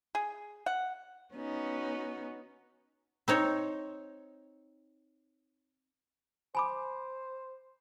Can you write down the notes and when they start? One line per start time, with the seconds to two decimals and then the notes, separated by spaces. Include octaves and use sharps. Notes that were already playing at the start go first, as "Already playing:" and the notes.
0.15 G#4
0.66 F#5
1.34 B3 C#4 D#4 F#4
3.28 C4 D#4 C#5
6.55 C5 G#5 B5 D6